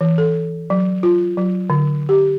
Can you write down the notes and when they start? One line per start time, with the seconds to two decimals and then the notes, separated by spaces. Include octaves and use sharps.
0.01 E3
0.18 A4
0.70 F#3
1.03 F4
1.37 F#3
1.70 D3
2.09 G4